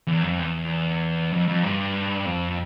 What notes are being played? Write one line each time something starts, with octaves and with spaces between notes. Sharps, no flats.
E2
F2
E2
F2
F2
G2
F2